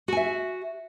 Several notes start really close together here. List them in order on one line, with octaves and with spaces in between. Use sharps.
F#4 G#5 E5